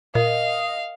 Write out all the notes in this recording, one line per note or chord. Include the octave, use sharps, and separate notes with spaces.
A#2 A#4 D#5 F5